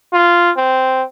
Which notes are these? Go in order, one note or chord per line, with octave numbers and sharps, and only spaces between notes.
F4
C4